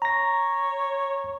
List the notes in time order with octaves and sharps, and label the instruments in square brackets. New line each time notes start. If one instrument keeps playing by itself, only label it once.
[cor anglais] C#5 [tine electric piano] A#5 A#6